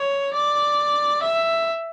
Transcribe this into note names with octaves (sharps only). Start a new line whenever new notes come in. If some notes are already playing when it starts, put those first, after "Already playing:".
Already playing: C#5
D5
E5